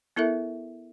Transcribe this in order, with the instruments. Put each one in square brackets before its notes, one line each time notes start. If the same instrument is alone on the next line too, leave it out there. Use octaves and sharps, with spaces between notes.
[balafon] B3 E4 A4 A#4 E5